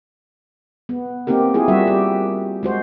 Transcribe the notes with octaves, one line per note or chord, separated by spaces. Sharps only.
B3
A#3 C4 D#4 G4 A#4
C4 E4 F4 G#4
G3 F#4 E5
G4
G#3 F#4 C5